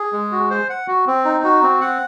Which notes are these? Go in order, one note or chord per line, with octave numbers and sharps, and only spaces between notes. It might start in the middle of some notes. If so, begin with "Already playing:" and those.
Already playing: G#4
G#3
F#4
C5
F#5
F#4
C4
D#4
F#4
C4
F#5